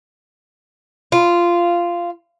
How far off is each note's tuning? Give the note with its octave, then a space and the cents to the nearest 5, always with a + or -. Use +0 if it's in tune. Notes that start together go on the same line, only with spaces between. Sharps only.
F4 -10